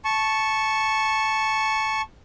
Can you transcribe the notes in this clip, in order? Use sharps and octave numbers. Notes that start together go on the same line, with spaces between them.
A5 C#6